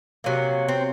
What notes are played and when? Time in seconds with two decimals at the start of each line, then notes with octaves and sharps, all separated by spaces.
0.24 C3 F#3 A#3
0.68 C4